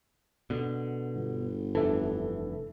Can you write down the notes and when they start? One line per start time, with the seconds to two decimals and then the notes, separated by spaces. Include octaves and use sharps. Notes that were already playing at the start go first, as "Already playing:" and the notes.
0.50 B2 D3
1.15 G1
1.75 F1 D3 E3 A4 E5